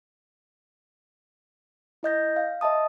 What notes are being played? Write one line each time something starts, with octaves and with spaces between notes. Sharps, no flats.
E4 D#5 G6 A#6
F5
D#5 E5 A5 D#6